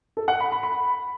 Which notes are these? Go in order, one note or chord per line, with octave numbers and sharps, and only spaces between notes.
A4
F#5
B5
B5
B5